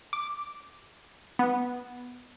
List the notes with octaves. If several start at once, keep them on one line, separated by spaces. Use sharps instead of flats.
D6
B3